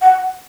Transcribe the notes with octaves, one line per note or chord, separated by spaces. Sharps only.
F#5